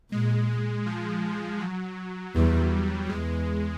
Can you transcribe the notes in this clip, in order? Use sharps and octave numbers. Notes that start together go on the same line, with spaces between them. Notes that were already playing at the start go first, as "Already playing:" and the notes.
A#2 G#3
F3
F#3
E2 G3
E2 G#3